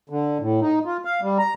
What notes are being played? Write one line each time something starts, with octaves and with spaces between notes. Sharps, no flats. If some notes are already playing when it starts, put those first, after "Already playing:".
D3
A2
D#4
F4
F5
G3
A#5